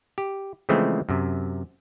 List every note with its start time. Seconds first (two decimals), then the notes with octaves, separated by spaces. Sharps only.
0.18 G4
0.69 C#3 E3 F3 G#3 A3 C4
1.09 F#2 C3